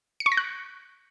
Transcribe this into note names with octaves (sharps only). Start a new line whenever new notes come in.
C#7
C#6
A#6
F#6